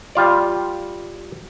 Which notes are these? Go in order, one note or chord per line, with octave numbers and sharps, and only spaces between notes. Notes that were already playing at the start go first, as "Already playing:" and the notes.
G3 F4 D5